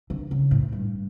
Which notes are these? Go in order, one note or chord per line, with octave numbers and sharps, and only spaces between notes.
D3
C#3
A2
G2